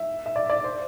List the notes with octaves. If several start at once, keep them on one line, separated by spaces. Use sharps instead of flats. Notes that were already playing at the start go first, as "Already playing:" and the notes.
Already playing: E5
E5
D5
D5
C5